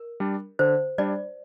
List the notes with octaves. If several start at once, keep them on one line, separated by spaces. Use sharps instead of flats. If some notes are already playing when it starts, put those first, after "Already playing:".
Already playing: A#4
G3 D4
D3 C5
G3 D4 D5